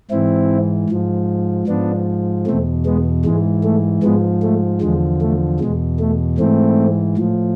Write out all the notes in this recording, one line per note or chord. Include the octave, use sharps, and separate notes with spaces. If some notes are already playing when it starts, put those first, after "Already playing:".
G#2 E3 C4 E4
G#2 F3
G#2 F3 B3 D4
E2 B2 A3 C4
G#3 B3
G#2 E3 G#3
A3
G#2 F3 G#3 B3
A3
E2 D3 F3 G#3
A3
E2 B2 G#3
A3
G#2 E3 A3 C4
A2 F3